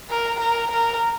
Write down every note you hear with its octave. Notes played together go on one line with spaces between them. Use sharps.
A#4
A#4
A#4